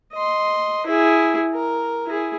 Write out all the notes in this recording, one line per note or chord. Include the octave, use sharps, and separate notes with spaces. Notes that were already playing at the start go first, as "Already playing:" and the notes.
D#5 C6
E4 G#4
A#4
E4 G#4